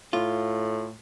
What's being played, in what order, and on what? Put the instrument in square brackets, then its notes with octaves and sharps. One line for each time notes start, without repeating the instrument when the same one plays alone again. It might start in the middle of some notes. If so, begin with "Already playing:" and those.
[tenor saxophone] A2 [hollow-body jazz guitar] F4